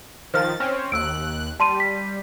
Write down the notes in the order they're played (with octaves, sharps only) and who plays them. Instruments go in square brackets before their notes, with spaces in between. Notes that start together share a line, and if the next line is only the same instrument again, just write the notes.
[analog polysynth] D#3 F3 A6 [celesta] C5 F5 F6
[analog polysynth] C4 C#4 [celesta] F6
[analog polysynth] D#2 F#6 [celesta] E6 D7
[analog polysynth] G3 [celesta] A5 C6 D#7
[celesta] B6